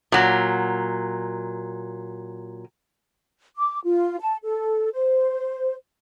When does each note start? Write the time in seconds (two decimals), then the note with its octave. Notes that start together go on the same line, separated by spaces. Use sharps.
0.12 A#2 F#3
3.57 D6
3.85 F4
4.20 A5
4.44 A4
4.93 C5